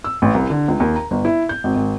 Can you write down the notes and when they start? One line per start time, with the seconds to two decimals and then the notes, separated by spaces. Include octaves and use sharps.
0.04 E6
0.22 A1
0.35 C2
0.50 D3
0.68 C#2
0.80 D#2
0.96 A#5
1.11 G1
1.25 E4
1.49 G6
1.64 G#1
1.76 G#1